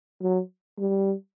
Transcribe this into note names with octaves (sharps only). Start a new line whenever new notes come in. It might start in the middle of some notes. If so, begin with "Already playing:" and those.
F#3
G3